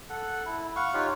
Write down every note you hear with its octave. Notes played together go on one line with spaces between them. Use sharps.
A4 F#5
E4
F5 F#5 C#6
D#4 F4 G4 C#5